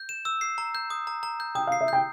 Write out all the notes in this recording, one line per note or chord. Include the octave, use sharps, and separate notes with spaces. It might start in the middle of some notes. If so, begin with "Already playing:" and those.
Already playing: G6
E7
E6
C7
A#5
G6
D#6
A#5
A#5
G6
G5 D#6
F5
C7
E5
G5 G6